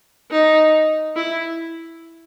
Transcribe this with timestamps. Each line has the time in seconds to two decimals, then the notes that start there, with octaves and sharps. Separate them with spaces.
0.31 D#4
1.16 E4